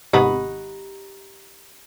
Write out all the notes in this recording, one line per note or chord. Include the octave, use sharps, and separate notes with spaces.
G#1 C3 B3 D#4 G4 F#5 B5